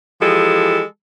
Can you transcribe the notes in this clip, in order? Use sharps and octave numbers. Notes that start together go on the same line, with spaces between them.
E3 F3 G#3 G4 A4